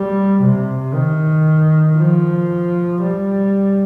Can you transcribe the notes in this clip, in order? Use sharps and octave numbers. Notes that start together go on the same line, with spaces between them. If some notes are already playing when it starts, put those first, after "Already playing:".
Already playing: G3
C3
D#3
F3
G3